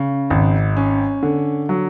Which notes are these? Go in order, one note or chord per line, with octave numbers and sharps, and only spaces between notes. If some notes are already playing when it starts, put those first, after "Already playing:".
Already playing: C#3
G#1
C#4
D3
F#3